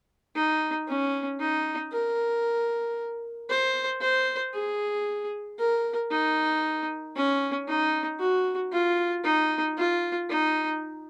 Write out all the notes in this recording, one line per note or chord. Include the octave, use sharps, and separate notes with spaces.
D#4
C#4
D#4
A#4
C5
C5
G#4
A#4
D#4
C#4
D#4
F#4
F4
D#4
F4
D#4